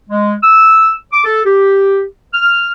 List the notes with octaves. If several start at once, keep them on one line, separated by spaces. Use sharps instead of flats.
G#3
E6
D6
A4
G4
F6